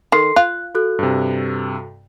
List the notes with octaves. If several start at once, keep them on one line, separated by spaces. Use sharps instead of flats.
D#3 A4 C6 C7
F4 F#6
F#4 A4 F#6
G2 C3